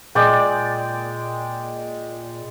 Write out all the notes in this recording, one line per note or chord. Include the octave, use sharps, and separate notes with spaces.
A#2 G#3 D5 G5